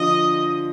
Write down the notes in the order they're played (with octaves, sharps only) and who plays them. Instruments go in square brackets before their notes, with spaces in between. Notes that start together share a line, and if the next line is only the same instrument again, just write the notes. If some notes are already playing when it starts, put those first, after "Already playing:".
Already playing: [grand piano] D3 F3 [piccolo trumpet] D#5